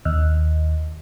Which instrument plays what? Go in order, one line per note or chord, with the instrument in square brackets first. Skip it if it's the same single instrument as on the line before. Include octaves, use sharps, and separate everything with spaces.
[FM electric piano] D#2